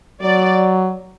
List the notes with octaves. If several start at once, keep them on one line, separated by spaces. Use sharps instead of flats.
F#3 D5